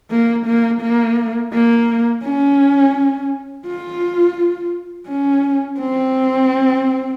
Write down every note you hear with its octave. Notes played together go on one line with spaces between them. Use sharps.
A#3
A#3
A#3
A#3
C#4
F4
C#4
C4